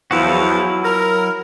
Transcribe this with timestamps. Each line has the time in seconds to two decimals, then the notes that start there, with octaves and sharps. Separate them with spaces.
0.11 E2 F3 F#3 E4 F#4
0.85 A#4